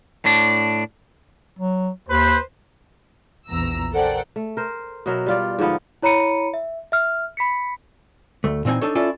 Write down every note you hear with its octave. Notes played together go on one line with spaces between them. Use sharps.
A2 D4
F#3
D#2 B4 C5
A#1 E2 A#5 E6
A4 A#4 C5 D5 F#5 G5
A3
A#4 C5
B2 F#3 A#4 E5
G3 F4 D5
G#2 D3 F3 B3
E4 C#5 A#5 B5 C#7 D#7
E5
E5 F6
B5 B6 C#7
D2 A3
A#2 E3 C4 D#4 G#5
D4 D#4 A4 C#5
C#4 E4 F4 A4 D5